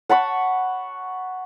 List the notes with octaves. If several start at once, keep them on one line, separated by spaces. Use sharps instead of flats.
F#5 A5 B5 C#6